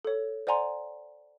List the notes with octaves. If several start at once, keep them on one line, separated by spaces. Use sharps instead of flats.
A4 C#5
C5 D5 F#5 G#5 A#5 C6